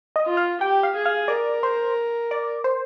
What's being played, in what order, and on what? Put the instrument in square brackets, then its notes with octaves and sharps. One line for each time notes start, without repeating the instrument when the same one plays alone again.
[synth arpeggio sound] D#5
[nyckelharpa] F4
[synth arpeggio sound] F5
[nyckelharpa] G4 [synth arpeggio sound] G5
[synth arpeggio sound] F5
[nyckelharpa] G#4
[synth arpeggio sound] F5
[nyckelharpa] A#4 [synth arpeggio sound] D5
[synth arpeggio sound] C5
D5
C5